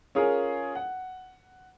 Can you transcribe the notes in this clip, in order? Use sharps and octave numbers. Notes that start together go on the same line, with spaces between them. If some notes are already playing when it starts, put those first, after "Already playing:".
C#4 F4 G#4 A#4
F#5